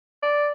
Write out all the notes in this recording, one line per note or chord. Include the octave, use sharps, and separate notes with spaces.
D5